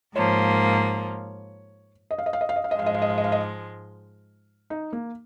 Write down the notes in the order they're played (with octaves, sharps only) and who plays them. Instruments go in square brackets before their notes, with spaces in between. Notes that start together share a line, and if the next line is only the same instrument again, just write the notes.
[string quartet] G#2 F3 A#3 [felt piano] C#5
[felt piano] D#5
F5
D#5
F5
D#5
F5
D#5
F5
D#5
[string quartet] G#2 F3 G#3 [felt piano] F5
[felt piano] D#5
F5
D#5
F5
D#5
F5
D#5
D#4
A#3